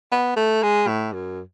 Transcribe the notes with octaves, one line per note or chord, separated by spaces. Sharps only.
B3
A3
G#3
A2
F#2